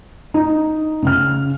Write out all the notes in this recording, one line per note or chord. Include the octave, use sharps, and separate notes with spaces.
D#4
C#3 C#4 F6